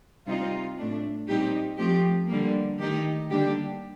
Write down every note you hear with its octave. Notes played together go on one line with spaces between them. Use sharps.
C3 G3 C4 D#4 F4
A2 A3 D4
A#2 G3 C4 D#4 G4
F3 A3 C4 G4
D3 G3 A#3
D#3 A3 D#4 G4
D3 G3 A#3 D4 G4